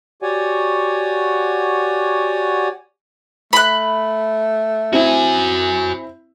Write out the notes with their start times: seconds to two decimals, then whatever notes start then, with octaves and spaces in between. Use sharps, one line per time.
0.22 F#4 G4 C#5 D5 F#5 G#5
3.53 A3 B5 F#6
4.93 C4 E4 F#4 G#5